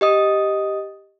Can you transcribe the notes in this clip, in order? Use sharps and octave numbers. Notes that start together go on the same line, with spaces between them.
G4 D#5 D#6